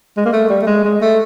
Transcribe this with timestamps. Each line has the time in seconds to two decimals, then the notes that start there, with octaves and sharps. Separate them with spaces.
0.17 G#3
0.25 A#3
0.33 A3
0.50 G3
0.63 A3
0.67 G#3
0.85 G#3
1.01 A3